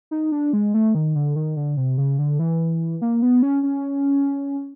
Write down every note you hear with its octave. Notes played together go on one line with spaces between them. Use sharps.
D#4
D4
G#3
A3
D#3
D3
D#3
D3
C3
C#3
D3
E3
A#3
B3
C#4
C#4